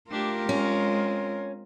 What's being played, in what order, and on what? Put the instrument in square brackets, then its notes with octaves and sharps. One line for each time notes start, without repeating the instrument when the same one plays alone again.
[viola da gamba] A3 D4 G4 [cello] F4 A#4
[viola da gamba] G#3 C4 [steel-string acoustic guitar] C#4